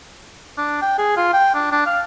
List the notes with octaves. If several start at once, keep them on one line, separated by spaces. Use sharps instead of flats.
D4
G5
G#4
F4
G5
D4
D4
F5